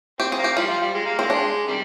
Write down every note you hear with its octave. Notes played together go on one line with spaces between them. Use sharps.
C4 G4
G#4
A#3
G4
G3 F4
F3
G3
G#3
A#3
G#3 C4
D4
C3 D#3 G3